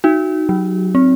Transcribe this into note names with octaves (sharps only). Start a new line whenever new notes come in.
D#4 F#4
F#3
C4